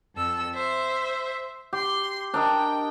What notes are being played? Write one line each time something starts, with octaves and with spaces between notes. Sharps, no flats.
F2 A4 E6
C5 E5
G4 C6
D4 A#4 D#5 G5